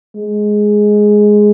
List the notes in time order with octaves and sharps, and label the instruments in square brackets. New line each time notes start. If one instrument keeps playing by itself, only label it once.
[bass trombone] G#3